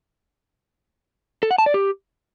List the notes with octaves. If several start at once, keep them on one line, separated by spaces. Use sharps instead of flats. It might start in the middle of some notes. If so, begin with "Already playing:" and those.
A4
F#5
A5
D5
G4